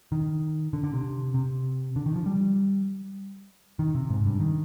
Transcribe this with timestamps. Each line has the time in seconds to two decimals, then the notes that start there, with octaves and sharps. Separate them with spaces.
0.12 D#3
0.73 D3
0.84 D3
0.94 C3
1.34 C3
1.96 D3
2.06 D#3
2.16 F3
2.26 G3
3.79 D#3
3.95 C3
4.10 G#2
4.25 G2
4.40 D#3